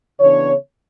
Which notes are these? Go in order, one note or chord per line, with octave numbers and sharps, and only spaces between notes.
C#3 E3 B3 D4 C#5